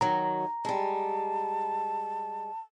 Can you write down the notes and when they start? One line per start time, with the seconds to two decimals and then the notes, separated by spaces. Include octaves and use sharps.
0.01 D#3 F#3 A#5
0.65 G3 G#3 A5